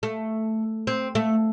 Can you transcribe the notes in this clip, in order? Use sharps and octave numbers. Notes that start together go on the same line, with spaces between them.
A3
C4
A3